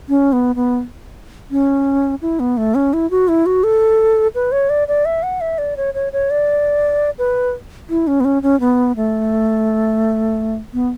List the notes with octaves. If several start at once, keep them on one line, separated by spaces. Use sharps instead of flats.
C#4
B3
B3
C#4
E4
B3
A3
C#4
E4
F#4
E4
F#4
A4
B4
C#5
D5
D5
E5
F#5
E5
D5
C#5
C#5
C#5
D5
B4
E4
C#4
B3
C#4
C#4
B3
A3
B3